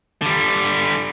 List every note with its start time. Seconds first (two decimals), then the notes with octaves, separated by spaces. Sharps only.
0.22 D3 G3